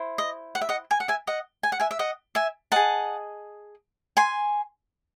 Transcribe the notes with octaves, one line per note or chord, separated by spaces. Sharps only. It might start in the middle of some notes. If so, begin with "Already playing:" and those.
Already playing: E4 C5
D#5
F#5
E5
D#5 F#5
G#5
F#5
E5 G#5
D#5 F#5
G#5
F#5
E5 G#5
E5
D#5 F#5
E5 G#5
G#4 D#5 F#5 A5
G#5 C6